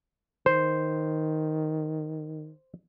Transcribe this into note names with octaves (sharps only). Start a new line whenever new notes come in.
D#3 C5